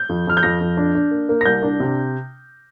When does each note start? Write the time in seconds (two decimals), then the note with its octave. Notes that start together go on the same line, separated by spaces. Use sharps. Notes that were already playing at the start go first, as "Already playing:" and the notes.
Already playing: G6
0.09 F2
0.27 F2 F6
0.37 G6
0.43 F2 A#6
0.61 F2
0.77 D4
0.95 D4
1.11 A#3
1.29 A#3
1.41 A#6
1.46 C2 G6
1.62 D4
1.80 C3